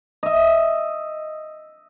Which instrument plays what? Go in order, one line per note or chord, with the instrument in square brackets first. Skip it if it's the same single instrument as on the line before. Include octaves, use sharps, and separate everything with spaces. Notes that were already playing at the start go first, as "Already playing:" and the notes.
[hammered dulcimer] D#5 E5